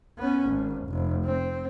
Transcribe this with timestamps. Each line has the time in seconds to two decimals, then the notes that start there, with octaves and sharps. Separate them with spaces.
0.18 B3 C#4
0.48 G#1
0.89 F1
1.24 C4